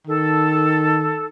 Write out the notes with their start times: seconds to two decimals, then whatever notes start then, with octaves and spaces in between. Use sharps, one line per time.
0.07 D#3 A4